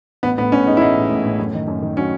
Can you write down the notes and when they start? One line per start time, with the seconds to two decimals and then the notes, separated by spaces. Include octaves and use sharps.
0.23 A1 B3
0.38 A2 B3
0.52 A1 C#4
0.66 G#3 D#4
0.77 E4
0.81 A1 D#4
0.96 A2
1.10 A1
1.25 A2
1.39 F#2
1.54 D#3
1.68 F#2
1.82 D#3
1.97 F#3 C#4